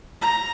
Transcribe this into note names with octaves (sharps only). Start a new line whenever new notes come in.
A#5